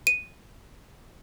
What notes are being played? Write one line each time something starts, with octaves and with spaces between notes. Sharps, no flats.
D#7